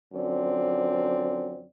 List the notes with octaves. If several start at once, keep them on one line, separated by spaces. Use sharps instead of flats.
F#2 D3 F3 C4 D5